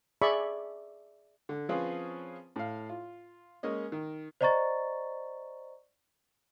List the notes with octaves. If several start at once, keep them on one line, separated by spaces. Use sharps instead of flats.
G#4 D5 E5 B5 C#6
D3
F3 C4 C#4 F4 G#4 B4
A2 F5
F4
G#3 A#3 C#4 D#5
D#3
C5 D5 D#5 A#5 C#6 A6